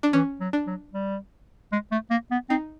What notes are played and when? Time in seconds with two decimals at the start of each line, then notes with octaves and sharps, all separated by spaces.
0.03 D4
0.13 E3 C#4
0.40 F#3
0.53 D4
0.67 F#3
0.93 G3
1.72 G#3
1.91 A3
2.10 A#3
2.31 B3
2.50 C4 D#4